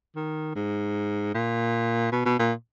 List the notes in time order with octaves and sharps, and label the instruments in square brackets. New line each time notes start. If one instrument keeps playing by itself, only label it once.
[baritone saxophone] D#3
G#2
A#2
B2
B2
A#2